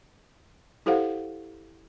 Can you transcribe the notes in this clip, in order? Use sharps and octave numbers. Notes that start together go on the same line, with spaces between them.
E4 G4 A4 C5 F5 F#5